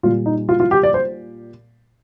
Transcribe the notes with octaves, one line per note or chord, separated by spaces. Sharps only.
A#2 G3 F4
D#4
F4
F4
G4
D5
C5